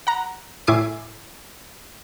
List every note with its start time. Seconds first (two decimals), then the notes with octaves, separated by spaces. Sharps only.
0.07 F#5 A#5
0.67 A2 E4 G#5 D6 C7